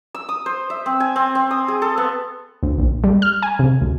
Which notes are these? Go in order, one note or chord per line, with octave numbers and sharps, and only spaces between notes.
E6
D#6
C5
E5
C4
G#5
C4
C4
D#6
G#4
A4
B3
D2
A#1
G3
F6
G#5
C3
D2